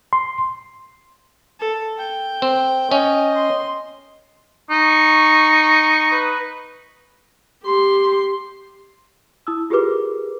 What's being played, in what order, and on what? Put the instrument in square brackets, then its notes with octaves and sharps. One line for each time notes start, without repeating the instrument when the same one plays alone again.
[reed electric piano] C6
[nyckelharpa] A4
G5
[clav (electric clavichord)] C4
[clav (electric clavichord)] C#4 [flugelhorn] D#5
[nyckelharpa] C6
[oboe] D#4 [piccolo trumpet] C#6
[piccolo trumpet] B4
[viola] G4 C6
[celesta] E4 D#6 E6
F4 G4 G#4 A#4 B4 D6